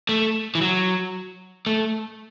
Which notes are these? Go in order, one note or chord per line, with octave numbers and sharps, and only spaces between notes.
A3
E3
F#3
A3